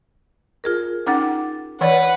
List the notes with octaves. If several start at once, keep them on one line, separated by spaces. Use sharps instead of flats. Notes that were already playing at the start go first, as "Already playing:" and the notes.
F4 G#4 A#4
C#4 D#4 F#5 D6 A6
E3 B4 C#5 D5 F#5